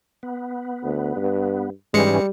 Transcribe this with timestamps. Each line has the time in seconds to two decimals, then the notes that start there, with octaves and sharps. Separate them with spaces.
0.23 B3
0.83 D2
1.16 G2
1.94 G#2 E3 G3 G#3 C#4 C#7